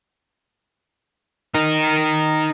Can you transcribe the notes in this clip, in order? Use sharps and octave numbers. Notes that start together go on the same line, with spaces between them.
D#4 A#4